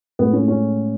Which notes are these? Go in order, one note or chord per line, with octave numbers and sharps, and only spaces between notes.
A2 G#3 B3
C#4
C#4